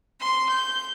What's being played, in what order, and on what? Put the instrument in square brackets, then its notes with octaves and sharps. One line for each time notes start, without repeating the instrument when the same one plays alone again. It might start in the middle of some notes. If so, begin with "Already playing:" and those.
[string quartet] C6
G6